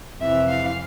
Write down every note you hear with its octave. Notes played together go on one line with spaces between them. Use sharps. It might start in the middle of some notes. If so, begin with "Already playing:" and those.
F2 C3 E3 E5
F5